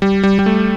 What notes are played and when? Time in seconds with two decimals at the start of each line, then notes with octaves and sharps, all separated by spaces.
0.02 G3
0.23 G3
0.39 G3
0.46 A3